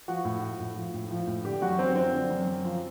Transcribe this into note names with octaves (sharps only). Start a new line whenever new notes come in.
F3 F#4
A2
F3
A2
F3
A2
F3
A2
D3 G4
F#2 F#4
F#2 C4
F3 C4
D3
F#2
F#2
F3